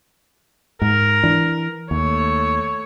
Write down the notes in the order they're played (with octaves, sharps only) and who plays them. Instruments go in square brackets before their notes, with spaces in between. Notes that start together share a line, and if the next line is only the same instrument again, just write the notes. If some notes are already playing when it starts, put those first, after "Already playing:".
[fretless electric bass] G#2 [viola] A#4
[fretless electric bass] E3 D4
[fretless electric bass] D#2 [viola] A3 C#5